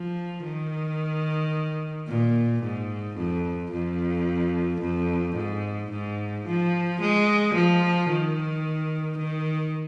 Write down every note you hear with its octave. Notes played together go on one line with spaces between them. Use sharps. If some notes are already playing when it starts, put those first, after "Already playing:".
Already playing: F3
D#3
A#2
G#2
F2
F2
F2
G#2
G#2
F3
G#3
F3
D#3
D#3